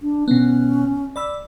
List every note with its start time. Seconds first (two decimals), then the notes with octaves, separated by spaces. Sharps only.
0.02 D4
0.28 B2 B3 C#4
1.16 D5 B5 E6